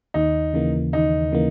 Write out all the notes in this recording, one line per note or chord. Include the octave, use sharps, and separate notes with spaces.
D#2 D#4
C#3 E3 A#3
D#2 D#4
C#3 E3 A#3